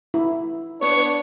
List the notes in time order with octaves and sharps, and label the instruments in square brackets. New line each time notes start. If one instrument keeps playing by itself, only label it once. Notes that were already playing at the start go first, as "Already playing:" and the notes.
[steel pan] E4
[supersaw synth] B3 C#5 [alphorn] D4 [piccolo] C#6